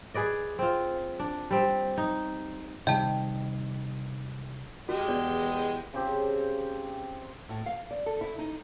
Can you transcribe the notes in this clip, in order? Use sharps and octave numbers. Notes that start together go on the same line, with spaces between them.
G#4 B4 D5 D#5
C4 F4
D4
G3 C4
D#4
C3 D#3 G3 D#5 G5 A5
G#3 F#4 G4 A#4 D#5 G5
E2 B3 D5
C#3 C4 G4 A5
A2
F5
D5
A4
E4
D#4